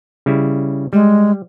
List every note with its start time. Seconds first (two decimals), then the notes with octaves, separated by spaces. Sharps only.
0.26 C#3 G3 E4
0.93 G3 G#3